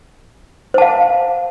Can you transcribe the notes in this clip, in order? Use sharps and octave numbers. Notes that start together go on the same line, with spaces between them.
C5 F5 A5